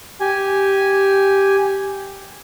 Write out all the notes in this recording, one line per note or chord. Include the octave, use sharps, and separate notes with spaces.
G4 G#5